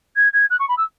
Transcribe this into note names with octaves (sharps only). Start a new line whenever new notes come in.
G#6
G#6
F#6
C#6
B5
E6